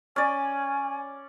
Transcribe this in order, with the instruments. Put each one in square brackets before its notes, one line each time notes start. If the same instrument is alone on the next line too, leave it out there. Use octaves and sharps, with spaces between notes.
[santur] C#4 D5 [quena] G#5